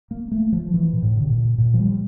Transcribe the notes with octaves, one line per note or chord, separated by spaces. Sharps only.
A#3
A3
F3
E3
A#2
A2
D3
C3
A#2
A#2
F3
G3